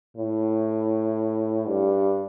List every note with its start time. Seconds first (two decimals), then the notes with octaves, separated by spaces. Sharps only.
0.17 A2
1.68 G2